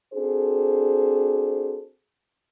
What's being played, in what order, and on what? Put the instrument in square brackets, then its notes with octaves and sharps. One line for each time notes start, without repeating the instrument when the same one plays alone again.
[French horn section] C4 D4 F#4 G#4 A4 C5